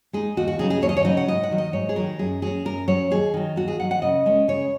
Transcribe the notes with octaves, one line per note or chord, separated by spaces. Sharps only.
G#3 D#4 G#4
D#2 F#4
F#4
C#3 F#3 D#4 G#4
G#4
D#2 C#5
D#5
C#5
C#3 F#3 D#4 D#5
F#5
G#2 D#5
F#5
D#3 F#3
D#5
G#2 C#5
G#4
D#3 F#3 A#4
F#2 G#4
F#3 C#4 G#4
F#2 A#4
F#3 C#4 C#5
D#2 G#4
D#3 F#3
D#2 F#4
G#4
D#3 F#3 F#5
F#5
C#3 D#5
G#3 C#4
C#3 C#5